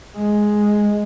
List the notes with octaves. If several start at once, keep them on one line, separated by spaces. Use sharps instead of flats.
G#3